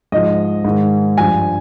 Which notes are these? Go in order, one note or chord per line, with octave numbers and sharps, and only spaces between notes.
G#2 F3 D#5
G#2 D#3
G2 F3 G#5